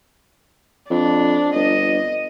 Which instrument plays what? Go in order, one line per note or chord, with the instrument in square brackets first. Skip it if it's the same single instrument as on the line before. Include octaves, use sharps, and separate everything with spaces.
[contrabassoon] F2 [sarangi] D4
[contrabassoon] G1 [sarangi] D#5